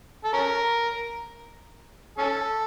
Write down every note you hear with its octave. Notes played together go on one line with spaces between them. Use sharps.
A4
C#4 A#4
C#4 A4